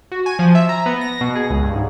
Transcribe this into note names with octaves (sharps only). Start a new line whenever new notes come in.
F#4
G#5
F3
E5
A#5
B3
A#6
B2
G#4
C#2
G2
G#2